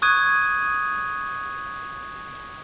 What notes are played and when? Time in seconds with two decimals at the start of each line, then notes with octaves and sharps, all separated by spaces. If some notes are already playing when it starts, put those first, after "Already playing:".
0.02 C#6 D#6 F#6 G#6 D#7